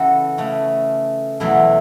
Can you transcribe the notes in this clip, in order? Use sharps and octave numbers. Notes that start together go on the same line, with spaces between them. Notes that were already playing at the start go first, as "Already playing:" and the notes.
Already playing: C#3 E3 B3 F#4 A4 B4
C#3 A3 C#4
E2 B2 F#3 A3 E4